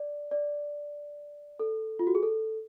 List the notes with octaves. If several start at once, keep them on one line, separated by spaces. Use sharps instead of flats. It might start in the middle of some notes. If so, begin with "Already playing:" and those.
Already playing: D5
D5
A4
F4
F#4
G#4
A4